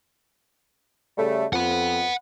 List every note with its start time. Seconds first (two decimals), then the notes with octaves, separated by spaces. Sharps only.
1.18 C#3 G3 A3
1.53 F2 F#5 B5